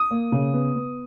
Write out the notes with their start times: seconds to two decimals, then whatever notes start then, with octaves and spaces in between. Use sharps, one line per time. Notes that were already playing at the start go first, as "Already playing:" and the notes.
Already playing: D#6
0.11 A#3
0.32 C#3
0.53 B3
0.75 B3